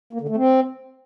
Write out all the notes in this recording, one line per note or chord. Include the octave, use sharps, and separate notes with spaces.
A#3
D3
A3
C4